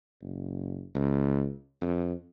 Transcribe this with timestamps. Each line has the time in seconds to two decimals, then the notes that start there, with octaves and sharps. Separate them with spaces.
0.21 F#1
0.95 C#2
1.81 F2